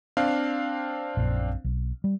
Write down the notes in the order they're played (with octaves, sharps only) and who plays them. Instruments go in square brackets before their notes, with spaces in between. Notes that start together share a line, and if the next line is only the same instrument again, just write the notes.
[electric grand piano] C4 D4 F5
[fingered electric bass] A#1 F#2 A#2
B1
G3